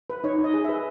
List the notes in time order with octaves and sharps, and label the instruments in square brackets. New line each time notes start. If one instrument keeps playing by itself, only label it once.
[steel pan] B4
D#4 C#5
D#4
D#5
G#4
B4 E5